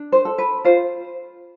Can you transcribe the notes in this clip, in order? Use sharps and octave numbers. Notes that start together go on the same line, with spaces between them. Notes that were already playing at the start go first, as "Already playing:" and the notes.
Already playing: D4
C5
A4
B4
F4 C5